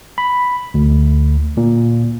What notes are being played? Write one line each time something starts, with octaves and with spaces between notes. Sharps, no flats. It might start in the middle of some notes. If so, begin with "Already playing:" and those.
B5
D2
A#2